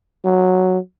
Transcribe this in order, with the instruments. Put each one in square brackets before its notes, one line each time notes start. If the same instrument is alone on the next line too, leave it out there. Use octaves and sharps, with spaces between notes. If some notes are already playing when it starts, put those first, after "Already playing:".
[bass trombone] F#3